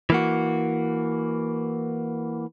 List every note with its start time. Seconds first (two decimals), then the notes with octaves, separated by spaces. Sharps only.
0.10 E3 A#3 F#4